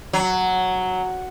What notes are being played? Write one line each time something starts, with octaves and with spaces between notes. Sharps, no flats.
F#3